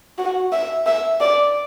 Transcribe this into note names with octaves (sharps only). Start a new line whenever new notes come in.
F#4
E5
E5
D5